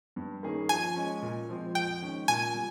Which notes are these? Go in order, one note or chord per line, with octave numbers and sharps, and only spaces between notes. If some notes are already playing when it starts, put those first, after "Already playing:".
G2
D#3 A#3 C#4 G#4
F3 G#5
G#3 C#4
A#2
F3 G#3 C4
F2 G5
D#3 G#3 C#4
A#2 G#5
G3